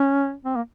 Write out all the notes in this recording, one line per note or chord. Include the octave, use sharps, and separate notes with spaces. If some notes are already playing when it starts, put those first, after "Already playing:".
Already playing: C#4
C4
A#3